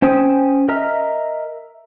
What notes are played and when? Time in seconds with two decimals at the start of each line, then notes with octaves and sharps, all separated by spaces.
0.02 C#4 C5 G5 G#5 D#6
0.68 A#4 D#5 E5 A#5 F6